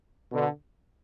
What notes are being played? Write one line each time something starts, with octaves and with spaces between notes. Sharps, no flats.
B2 D3